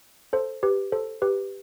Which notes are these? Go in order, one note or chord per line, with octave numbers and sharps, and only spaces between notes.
A4 C5
G4 B4
A4 C5
G4 B4